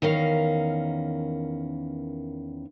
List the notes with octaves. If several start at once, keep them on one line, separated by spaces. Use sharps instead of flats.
E2 D#3 C#4 A#4 F5